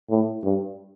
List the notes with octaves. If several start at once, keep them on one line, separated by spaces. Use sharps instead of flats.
A2
G2